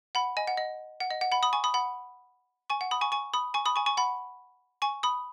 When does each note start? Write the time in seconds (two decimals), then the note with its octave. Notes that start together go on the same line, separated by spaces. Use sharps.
0.15 F#5 B5
0.37 D#5 G#5
0.47 F#5
0.57 D#5
1.00 F#5
1.11 D#5
1.21 F#5
1.32 F#5 B5
1.43 B5 D#6
1.53 G#5 C#6
1.64 B5 D#6
1.74 F#5 B5
2.70 G#5 C#6
2.81 F#5
2.91 B5 D#6
3.01 G#5 C#6
3.12 G#5 C#6
3.34 B5 D#6
3.54 G#5 C#6
3.66 B5 D#6
3.76 G#5 C#6
3.86 G#5 C#6
3.97 F#5 B5
4.82 G#5 C#6
5.03 B5 D#6